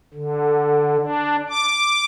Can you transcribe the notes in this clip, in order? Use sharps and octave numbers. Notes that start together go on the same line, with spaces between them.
D3
D4
D6